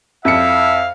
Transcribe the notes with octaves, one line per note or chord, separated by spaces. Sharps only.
F2 E4 E5 F5 C#7